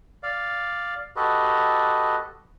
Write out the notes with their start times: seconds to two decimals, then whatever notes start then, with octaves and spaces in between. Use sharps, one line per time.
0.23 D5 F5
1.16 F#4 G4 A4 B4 D#5